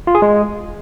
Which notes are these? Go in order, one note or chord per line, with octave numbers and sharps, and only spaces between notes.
F4
G#4
G#3